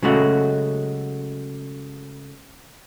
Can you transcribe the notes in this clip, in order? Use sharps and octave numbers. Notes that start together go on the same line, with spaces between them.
C#3 F#3 G#3 A3 F#4